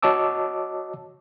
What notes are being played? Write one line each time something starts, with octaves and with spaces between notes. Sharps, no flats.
F#4 C#5 D#5 A5 D6 E6